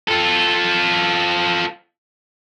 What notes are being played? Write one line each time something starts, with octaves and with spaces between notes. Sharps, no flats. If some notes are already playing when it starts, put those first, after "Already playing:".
F4 A4